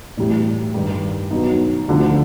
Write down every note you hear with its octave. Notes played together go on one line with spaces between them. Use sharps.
A2 E3 G3
G2 D#3 G3
B2 F#3 B3 D#4
D2 D3 F3